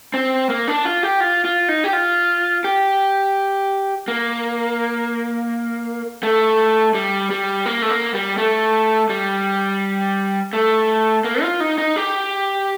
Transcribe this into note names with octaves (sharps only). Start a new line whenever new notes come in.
C4
A#3
D4
F4
G4
F4
F4
D#4
G4
F4
G4
A#3
A3
G3
G3
A#3
A3
A#3
G3
A3
G3
A3
A#3
F4
D#4
D#4
G4